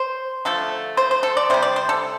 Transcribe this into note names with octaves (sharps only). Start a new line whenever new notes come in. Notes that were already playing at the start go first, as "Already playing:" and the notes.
Already playing: C5
D3 F3 A3 A4
C5
C5
A4
D5
C3 G3 C5
D5
C5
A4